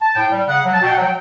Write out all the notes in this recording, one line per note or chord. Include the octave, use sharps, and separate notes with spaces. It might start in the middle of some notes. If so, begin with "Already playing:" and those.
A5
A2 G5
G3
C#3 F#5
F#3
A5
B2 G5
F#5
F#3
G5